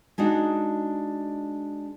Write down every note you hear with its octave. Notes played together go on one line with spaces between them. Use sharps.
G#3 D4 D#4 F#4